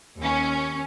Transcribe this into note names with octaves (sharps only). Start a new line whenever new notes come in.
D#2 C#4